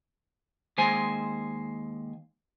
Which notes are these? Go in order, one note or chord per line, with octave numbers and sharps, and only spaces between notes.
D#2 G#3 C5 G#5